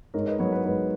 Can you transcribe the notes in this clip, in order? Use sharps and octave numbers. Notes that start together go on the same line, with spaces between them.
G#2 A#4 C#5
B4 D#5
F#3 B3 A#4 C#5
B4
G#2 B4